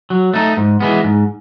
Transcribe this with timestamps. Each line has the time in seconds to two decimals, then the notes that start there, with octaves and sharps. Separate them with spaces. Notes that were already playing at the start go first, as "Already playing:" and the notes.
0.10 F#3
0.34 A3 D#4
0.57 G#2
0.80 E3 G#3 B3
1.04 G#2